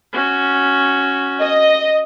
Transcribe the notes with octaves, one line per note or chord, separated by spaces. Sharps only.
C#4 F#4
D#5